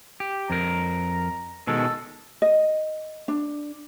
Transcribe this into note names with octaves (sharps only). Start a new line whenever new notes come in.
G4
F2 A#4 A#5
B2 D#3 G#3 A4
D#5
D4